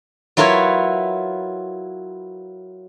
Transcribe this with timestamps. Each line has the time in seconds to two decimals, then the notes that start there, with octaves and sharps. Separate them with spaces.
0.37 F#3 E4 F4 A#4 B4 C#5